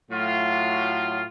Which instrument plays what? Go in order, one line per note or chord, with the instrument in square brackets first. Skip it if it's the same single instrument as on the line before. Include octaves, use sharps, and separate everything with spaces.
[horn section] A2 F#3 F4